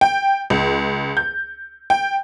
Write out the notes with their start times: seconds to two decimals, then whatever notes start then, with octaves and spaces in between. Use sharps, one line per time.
0.01 G5
0.50 C#2
1.17 G6
1.90 G5